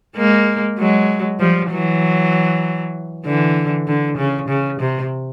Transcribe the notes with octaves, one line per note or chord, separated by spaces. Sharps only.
G#3 A#3
F#3 G#3
F3 G3
E3 F#3
D3 E3
D3
C#3
C#3
C3